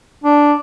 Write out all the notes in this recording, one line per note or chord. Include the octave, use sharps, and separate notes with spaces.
D4